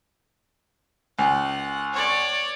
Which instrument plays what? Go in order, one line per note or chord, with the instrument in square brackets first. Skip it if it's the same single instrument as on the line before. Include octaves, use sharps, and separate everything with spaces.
[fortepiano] C#2 [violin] F#5
[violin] C#5 D5